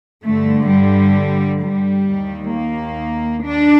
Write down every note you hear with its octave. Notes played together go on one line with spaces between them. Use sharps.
G2 D3 A3
G3
G3
D#2 D#3
A#3
D4